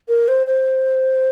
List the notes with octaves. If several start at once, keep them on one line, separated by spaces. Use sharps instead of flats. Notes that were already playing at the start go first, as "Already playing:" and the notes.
A#4
C5
C5